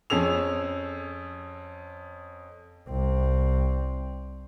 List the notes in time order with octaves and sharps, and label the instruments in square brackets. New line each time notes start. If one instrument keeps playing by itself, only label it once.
[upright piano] F2 C#4 G#4 E6 F7
[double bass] C2 C4